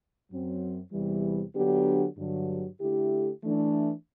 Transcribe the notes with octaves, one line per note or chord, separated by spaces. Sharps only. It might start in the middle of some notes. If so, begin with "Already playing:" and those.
F#2 F#3 C4
E2 C3 E3 G3
D3 F#3 B3 D4 G4
G2 D3 F#3
D3 A3 E4 G4
E3 A3 D4